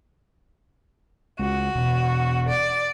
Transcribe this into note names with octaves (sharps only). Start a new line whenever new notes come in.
C#2 F#4
E1
D5